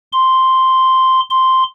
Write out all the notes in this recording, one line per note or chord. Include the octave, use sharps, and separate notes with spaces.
C6
C6